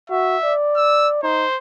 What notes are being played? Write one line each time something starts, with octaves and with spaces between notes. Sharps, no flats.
F#4 E5
D5
E6
D#4 C5